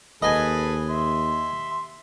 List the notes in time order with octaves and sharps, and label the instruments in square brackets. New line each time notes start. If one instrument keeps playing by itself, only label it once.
[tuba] D#2 [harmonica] G#4 A4 B4 [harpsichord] D#5 G#5
[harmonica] E5 C6